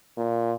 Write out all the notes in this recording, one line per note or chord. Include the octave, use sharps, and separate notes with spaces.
A#2